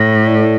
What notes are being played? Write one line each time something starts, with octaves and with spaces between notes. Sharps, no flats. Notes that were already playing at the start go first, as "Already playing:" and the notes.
Already playing: A2
E4 A4 D5